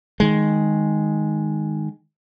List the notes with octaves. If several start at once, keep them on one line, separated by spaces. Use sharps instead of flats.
D#3 G#3